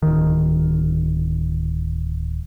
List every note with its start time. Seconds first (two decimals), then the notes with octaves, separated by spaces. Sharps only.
0.02 D1 D#3